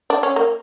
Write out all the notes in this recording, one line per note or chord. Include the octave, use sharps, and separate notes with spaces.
D4
C#4
A#3